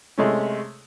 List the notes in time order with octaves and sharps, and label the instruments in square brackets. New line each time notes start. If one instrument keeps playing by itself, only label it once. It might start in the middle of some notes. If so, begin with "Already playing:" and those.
[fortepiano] C3 G#3 A3 C#4